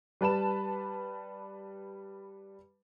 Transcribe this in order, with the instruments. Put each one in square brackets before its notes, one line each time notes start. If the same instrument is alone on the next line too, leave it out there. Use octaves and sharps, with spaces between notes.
[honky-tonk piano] G3 B4 A5 B5 E7